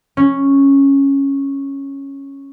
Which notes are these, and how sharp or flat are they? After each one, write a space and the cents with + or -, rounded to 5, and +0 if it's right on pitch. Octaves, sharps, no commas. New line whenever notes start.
C#4 -5